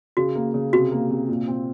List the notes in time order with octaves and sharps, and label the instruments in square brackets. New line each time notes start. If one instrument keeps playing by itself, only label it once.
[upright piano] C#3 [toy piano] F#4
[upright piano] A#3
C#3
[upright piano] C3 [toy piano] F#4
[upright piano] A#3
C3
A#2
C4